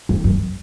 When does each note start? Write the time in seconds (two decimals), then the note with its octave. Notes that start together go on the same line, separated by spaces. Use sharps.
0.09 F2
0.24 F#2